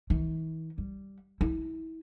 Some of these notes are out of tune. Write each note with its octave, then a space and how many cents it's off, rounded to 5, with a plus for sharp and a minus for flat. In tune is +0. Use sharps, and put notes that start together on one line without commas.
E3 -45
G3 -5
E4 -30